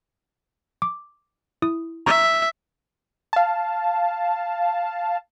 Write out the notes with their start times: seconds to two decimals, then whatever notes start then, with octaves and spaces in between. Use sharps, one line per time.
0.82 D6
1.62 E4 D#6
2.06 E5 A#5 C#6
3.33 F5 A5